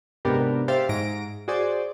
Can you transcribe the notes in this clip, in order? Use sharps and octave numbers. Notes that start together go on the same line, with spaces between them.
G#2 C3 B3 D4 G4 A#4
G4 C5 E5 F5 A6
G#2 A#6 D7
F#4 G#4 C5 D5